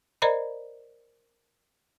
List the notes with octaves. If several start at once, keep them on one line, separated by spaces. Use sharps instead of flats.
A#4 C5 D5 D#5 A#5 B5